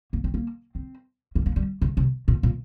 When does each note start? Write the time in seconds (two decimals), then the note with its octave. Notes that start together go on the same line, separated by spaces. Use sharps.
0.13 A#3
0.24 C4
0.34 A#3
0.75 C4
1.35 A#3
1.46 A#3
1.56 G3
1.82 C#3
1.97 C3
2.28 A#2
2.43 A#2